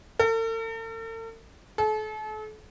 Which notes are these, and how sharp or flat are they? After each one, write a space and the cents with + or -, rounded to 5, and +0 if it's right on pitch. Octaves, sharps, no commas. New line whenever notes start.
A4 +45
A4 -40